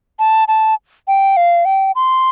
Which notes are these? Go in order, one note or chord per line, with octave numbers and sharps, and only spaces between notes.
A5
A5
G5
F5
G5
C6